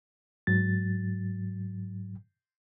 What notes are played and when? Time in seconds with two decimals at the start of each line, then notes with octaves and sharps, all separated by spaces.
0.47 G#2 F#3 A6